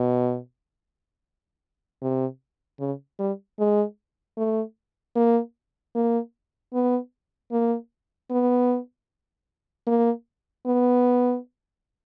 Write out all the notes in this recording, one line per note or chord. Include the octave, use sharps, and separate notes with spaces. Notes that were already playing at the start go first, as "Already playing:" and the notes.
Already playing: B2
C3
C#3
G3
G#3
A3
A#3
A#3
B3
A#3
B3
A#3
B3